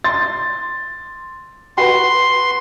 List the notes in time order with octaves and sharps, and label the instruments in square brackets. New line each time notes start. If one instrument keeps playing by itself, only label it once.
[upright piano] C6 A6
[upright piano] F#4 B4 [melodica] C6